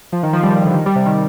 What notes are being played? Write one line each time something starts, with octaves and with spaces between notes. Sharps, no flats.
F3
D#3
F3
G3
D#3
D3
D#3
G3
C3
D#3